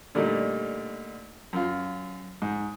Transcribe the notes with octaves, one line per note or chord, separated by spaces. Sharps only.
A#2 D3 G3 A3 D#4
F#2 F4
G#2